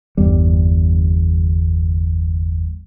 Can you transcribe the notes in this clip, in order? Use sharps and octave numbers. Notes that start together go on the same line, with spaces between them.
G1 E2 G2 G3